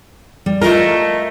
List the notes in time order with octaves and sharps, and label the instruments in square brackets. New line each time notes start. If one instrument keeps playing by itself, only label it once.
[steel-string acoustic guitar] G3
[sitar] A3 A#4 [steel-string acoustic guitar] F4 D#5